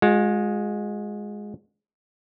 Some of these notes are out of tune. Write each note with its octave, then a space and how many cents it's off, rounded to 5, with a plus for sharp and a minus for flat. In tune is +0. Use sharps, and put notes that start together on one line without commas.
G#3 +0 F4 +45